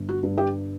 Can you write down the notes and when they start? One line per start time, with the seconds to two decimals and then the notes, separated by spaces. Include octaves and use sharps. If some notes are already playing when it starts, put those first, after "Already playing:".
Already playing: G1
0.09 F#4
0.23 G2
0.38 G4